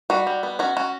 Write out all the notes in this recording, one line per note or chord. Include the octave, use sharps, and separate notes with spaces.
G3 F#4
G3
B3
C#4 F#4
C#4 F#4